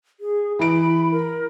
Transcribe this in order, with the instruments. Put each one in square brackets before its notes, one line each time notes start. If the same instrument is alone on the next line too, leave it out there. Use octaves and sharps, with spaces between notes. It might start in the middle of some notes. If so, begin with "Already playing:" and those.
[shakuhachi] G#4
[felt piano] E3 E4 D7 [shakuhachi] B5
[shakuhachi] A#4